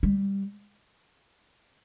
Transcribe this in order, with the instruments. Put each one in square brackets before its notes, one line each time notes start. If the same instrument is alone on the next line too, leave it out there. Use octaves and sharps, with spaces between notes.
[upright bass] G3